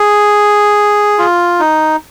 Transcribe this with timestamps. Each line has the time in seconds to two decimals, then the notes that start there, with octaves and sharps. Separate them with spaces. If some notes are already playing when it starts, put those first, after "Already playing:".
Already playing: G#4
1.19 F4
1.60 D#4